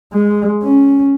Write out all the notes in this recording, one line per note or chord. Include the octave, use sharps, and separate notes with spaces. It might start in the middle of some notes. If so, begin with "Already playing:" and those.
G#3
C#4